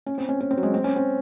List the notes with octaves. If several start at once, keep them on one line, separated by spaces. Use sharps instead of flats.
C#4
C4
C#4
C#4
C4
F#3
G#3
C4
C#4
C4